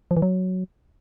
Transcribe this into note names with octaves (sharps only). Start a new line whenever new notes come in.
F3
E3
F#3